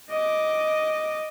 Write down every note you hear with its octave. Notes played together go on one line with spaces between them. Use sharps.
D#5 D6